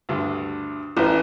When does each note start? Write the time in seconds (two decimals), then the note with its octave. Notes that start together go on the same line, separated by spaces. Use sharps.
0.09 D2 G2
0.97 A1 E4 B4